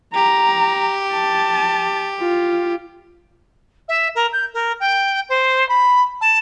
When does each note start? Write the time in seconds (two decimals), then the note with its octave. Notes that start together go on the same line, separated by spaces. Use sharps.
0.14 G4 A#5
1.13 A5
2.21 F4
3.89 E5
4.15 A#4
4.33 G6
4.54 A#4
4.80 G5
5.29 C5
5.69 B5
6.21 A5